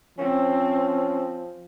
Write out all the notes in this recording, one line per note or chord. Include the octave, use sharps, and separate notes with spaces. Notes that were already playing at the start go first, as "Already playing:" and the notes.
F3 C4 C#4